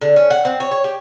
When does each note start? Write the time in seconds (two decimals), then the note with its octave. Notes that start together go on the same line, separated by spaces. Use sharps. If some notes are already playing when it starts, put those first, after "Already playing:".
0.01 D3
0.16 C#4
0.30 F#5
0.45 C4
0.60 C#5
0.71 C#5
0.84 G4